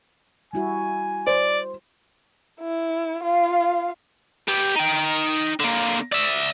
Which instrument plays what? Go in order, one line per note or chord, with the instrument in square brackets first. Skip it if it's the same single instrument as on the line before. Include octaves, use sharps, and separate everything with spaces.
[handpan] G3 E4 F#4 [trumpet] G#5
[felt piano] C5 [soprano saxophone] D5
[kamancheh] E4
F4 F5
[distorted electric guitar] B3 G4
D#4 G5
D3 A#3
D5 E5